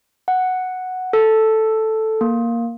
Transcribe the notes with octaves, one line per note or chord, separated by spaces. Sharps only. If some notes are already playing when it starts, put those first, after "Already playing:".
F#5
A4
A#3